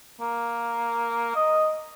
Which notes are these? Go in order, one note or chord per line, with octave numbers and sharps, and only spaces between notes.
A#3
D#5